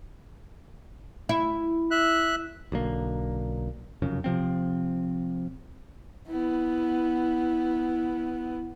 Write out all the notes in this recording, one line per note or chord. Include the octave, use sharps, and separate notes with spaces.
E4
E5 F#6
B1 D3 A#3
F1 F#2 C#3
C3 F3 C4
B3 E4